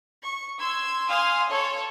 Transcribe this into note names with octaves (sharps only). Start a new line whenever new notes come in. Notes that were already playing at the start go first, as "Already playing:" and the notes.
C#6
C6 E6 G#6
F5 G#5 C6 D#6
A4 C#5